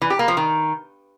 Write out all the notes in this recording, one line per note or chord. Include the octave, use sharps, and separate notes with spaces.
E3
G4
A#3
F3
D#3